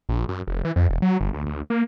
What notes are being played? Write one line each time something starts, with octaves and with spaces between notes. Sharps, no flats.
A#1
F#2
F1
E3
F2
E1
F#3
G1
D2
D2
A#3